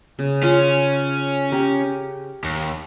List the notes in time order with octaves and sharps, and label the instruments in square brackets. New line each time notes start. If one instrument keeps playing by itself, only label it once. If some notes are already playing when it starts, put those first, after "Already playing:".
[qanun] C#3
[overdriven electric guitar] C#4 [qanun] F4
[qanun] G4 A#4
[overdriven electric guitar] D#2